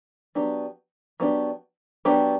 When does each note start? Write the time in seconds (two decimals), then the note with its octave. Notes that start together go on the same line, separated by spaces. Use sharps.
0.35 F#3 B3 D4 G4
1.20 F#3 B3 D4 G4
2.05 F#3 B3 D4 G4